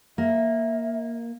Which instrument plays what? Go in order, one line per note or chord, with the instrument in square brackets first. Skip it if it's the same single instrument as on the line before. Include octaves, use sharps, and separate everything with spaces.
[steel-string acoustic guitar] A#3 [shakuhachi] E5